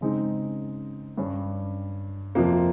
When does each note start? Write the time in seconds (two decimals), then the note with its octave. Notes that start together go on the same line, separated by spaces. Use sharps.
0.01 C#3 G#3 C4 D#4
1.18 G2 G3 C#4
2.35 F2 C3 F3 A#3